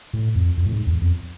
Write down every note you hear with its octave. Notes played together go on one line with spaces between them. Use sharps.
A2
F2
F2
A2
G#2
E2
F2